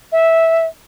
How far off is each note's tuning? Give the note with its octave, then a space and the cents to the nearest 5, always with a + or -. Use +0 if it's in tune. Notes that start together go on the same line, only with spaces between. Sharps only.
E5 -10